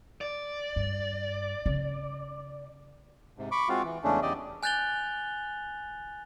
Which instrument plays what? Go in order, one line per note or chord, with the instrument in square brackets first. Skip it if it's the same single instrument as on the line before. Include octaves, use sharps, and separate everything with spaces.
[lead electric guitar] D5
[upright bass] G2
C#3
[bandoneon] G#2 C3
B5 C#6 D6
G#3 C4 F4 F#4 F5
E3
E2 C#3 G#3 A3 C#4 D4
E2 C#3 G4 D5 D#5
[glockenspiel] G#5 F#6 G6 A6 F7 G7